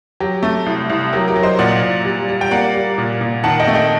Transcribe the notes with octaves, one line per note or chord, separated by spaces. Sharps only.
F#3 G4
A3
C2
C2
F#3 G4 A#4
G4 A#4
F#3
C5 D#5
A#2 D5 F#5
A#2
G3
G3
G5
A#3 D5 F#5
G3
A#2
A#2
D#3 F#5 A5
D#5 G5
A3
D#5 G5